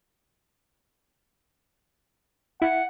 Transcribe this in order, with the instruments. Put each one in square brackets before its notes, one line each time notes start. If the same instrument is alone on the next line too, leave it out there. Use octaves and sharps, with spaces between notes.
[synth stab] E4 [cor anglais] F#5